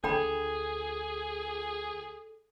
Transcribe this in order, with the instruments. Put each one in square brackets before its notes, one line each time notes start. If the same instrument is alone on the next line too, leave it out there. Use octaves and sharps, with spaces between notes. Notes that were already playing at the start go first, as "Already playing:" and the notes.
[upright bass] D2 [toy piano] D4 G5 B5 [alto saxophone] G#4 [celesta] A4 G#6